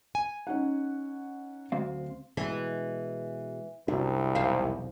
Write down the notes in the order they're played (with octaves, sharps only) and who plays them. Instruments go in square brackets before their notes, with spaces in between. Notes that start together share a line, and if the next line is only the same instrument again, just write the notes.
[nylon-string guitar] G#5
[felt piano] C#4 D#4 F#5
[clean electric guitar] D2 C4 F5 [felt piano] F#3
[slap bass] B2 G#3 [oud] E3
[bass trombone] C2 [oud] F#2 [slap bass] C3 D4
[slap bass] E1 B1 F2 [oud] C5 F5